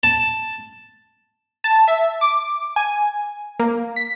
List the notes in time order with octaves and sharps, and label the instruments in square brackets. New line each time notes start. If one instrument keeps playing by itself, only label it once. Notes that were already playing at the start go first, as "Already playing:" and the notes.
[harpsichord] A5
[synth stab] A5
E5
D6
G#5
A#3
B6